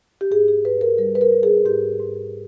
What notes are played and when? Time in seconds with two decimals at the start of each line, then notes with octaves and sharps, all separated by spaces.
0.21 G4
0.31 G#2 G#4
0.48 G#4
0.65 G#2 B4
0.81 A#4
0.98 G3 A#4
1.15 B4
1.21 A#4
1.32 G3
1.43 G#4
1.66 G#2 G4
2.00 G#2